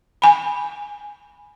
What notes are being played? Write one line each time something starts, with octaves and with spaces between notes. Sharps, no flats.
G#5 B5